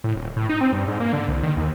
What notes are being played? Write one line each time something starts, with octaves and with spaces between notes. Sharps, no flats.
A2
D#1
A2
D#4
C4
G2
G#2
A#3
D3
C2
D#3
D#2